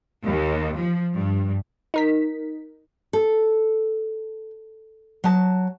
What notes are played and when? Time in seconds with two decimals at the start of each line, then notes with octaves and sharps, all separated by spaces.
0.24 D#2
0.77 F3
1.15 G2
1.94 D#4 A#4 B6
3.13 A4
5.24 F#3 A5